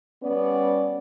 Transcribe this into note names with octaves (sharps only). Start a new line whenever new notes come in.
G3 B3 C#4 B4 D5